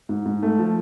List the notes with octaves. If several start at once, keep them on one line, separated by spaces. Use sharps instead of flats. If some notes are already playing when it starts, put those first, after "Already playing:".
G#2
G#2
A3
F3